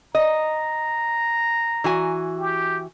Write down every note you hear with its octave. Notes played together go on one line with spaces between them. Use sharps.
D#5 A#5
E3 F#4 G#5
G4